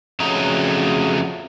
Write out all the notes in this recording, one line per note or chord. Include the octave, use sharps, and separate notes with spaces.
F2 C#3 F#3 A3 D#5 A#5